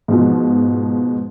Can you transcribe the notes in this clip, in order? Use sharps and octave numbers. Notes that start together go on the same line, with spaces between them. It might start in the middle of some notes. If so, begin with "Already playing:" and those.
G#2 B2 F3